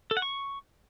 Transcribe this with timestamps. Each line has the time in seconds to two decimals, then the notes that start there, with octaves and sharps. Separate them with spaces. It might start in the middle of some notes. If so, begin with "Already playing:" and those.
0.11 A4
0.17 F#5
0.22 C#6